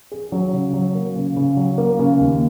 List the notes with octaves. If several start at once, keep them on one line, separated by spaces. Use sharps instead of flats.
G#4
F#3
C#3
F#3
A#3
C#3
C#3
F#3
A#3
C#3
D#2